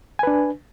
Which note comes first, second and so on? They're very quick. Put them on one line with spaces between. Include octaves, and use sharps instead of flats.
G#5 B4 D4